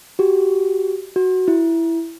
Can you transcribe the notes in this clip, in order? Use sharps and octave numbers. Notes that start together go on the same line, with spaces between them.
F#4 G4
F#4
E4